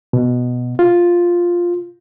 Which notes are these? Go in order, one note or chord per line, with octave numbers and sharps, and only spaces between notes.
B2
F4